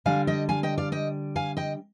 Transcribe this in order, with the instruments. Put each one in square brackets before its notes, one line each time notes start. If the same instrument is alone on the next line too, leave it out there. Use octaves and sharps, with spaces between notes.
[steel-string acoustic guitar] D3 G3 D4 F5 G#5
D#5 G5
F5 G#5
D#5 G5
D5 F5
D#5 G5
F5 G#5
D#5 G5